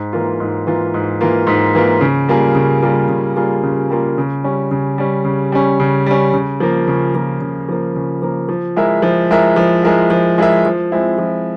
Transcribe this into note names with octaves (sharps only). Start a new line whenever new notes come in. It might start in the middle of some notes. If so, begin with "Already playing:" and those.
Already playing: G#2
E3 A#3 F4
G#2
E3 A#3 F4
G#2
E3 A#3 F4
G#2
E3 A#3 F4
C#3
G3 A#3 F4 G#4
C#3
G3 A#3 F4 G#4
C#3
G3 A#3 F4 G#4
C#3
G3 A#3 F4 G#4
C#3
G3 C#4
C#3
G3 C#4
C#3
G3 C#4
C#3
G3 C#4
C#3
F3 A#3
C#3
F3 A#3
C#3
F3 A#3
C#3
F3 A#3
F3
G#3 E4 A#4 E5
F3
G#3 E4 A#4 E5
F3
G#3 E4 A#4 E5
F3
G#3 E4 A#4 E5
F3
G#3 C4 E4
F3